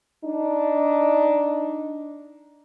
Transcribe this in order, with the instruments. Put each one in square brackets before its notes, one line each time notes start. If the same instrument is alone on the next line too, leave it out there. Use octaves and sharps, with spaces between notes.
[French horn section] D4 D#4